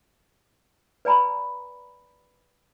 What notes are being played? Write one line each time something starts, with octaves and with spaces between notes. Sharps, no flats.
B4 D5 G#5 A#5 B5